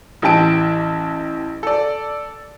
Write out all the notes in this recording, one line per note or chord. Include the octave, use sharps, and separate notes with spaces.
A1 E3 G4 A5 D7
A4 D5